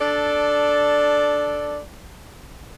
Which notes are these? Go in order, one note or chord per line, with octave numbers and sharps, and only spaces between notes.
D4 A4 D5